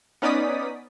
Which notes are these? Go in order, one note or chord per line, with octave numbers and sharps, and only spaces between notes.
B3 C#4 D#4 D5 D#6 B6